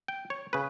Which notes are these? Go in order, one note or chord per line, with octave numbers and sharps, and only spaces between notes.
G5
C#5
C#3 B4